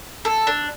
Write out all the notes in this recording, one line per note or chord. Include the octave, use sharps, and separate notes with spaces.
A4
D4